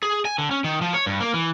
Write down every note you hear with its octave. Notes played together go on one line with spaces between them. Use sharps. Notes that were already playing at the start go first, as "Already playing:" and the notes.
G#4
G#5
D3
C#4
D#3
F3
C#5
G2
A#3
E3